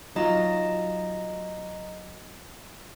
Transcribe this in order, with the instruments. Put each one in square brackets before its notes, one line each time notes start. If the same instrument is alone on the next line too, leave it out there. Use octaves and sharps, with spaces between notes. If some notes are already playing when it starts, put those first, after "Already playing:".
[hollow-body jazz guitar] F#3 D#4 F4 [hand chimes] D#5 A#5 A#6